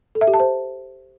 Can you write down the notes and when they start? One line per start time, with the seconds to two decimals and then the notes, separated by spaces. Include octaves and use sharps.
0.15 A4
0.21 E5
0.27 G4
0.34 A5
0.40 C5